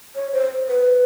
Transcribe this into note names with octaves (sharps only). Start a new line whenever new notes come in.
C#5
C5
B4